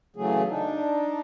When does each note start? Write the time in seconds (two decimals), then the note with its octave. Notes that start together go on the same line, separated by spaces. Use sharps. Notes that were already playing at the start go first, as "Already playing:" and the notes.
0.16 C#3 E3 F#3 A3 G#4
0.49 D4 D#4